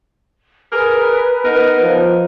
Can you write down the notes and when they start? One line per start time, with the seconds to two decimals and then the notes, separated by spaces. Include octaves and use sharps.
0.72 G#4 A#4 B4
1.45 B3 D#4 A#4
1.82 F3